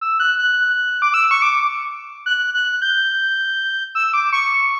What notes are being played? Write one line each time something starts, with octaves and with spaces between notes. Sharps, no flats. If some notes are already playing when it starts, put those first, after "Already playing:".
E6
F#6
F#6
D6
E6
C#6
D6
F#6
F#6
G6
E6
D6
C#6